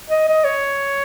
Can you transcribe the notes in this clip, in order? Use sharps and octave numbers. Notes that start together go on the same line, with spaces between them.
D#5
D#5
C#5